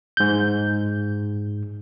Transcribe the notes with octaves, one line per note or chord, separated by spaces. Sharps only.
G#2 G6